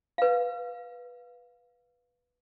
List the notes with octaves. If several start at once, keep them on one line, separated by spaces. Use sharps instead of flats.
B4 F5